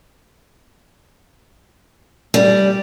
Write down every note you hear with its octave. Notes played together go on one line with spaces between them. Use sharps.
G3